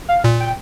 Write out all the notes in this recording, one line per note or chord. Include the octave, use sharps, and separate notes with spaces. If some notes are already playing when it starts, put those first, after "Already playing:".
F5
A#2
G5